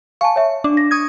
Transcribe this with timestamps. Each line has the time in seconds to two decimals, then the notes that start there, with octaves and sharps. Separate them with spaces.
0.21 F5 G#5 A5 C#6
0.36 C#5 E5
0.64 D4 D6
0.77 A#6
0.91 C#6 D#6 G#6